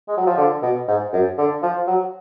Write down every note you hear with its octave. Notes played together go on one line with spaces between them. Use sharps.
G#3
F#3
F3
D3
B2
G#2
F#2
D3
F3
F#3